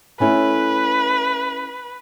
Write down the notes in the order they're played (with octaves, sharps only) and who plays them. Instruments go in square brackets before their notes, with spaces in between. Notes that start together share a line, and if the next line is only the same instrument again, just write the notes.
[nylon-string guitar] A3 C#4 E4 [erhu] B4